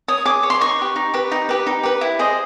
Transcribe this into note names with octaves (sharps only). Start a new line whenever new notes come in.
C#5 D#6
G#4 D6
C#5
C6
D#4 C#6
G4 B4
D#4
G4 B4
D#4
G4 B4
D#4
G4 B4
E4
G#4 C5 D#5